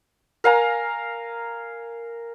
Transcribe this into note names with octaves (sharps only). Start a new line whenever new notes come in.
A#4 F5 G#5 A#5